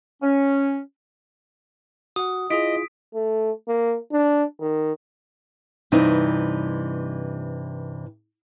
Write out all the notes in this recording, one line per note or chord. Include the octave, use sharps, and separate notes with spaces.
C#4
F#4 F#5 D#6
E4 F4 G#4 D#5 B6 D7
A3
A#3
D4
D#3
G2 C3 E3 C4 D#4